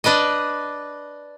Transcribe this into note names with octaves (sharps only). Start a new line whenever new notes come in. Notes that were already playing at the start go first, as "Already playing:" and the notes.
D4 B4 D5 D#5